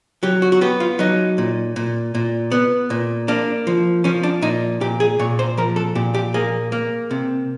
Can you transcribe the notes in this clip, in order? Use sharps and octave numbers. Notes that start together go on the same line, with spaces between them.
F#3 G4
F#4
F#4
B3 G4
F4
F#3 D#4
A#2
A#2
A#2
B3
A#2
A#3 D4
F3
F3 C#4
D4
A#2 D#4
A#2 G4
G#4
A#2 C#5
C5
F3 A#4
A4
A#2 G4
G4
A#3 G#4
A#3
C3